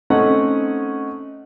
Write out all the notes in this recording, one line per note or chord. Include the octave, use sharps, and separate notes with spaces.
A3 C4 C#4 D#4 F#5